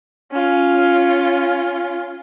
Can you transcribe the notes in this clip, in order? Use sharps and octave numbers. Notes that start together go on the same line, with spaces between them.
C#4 F4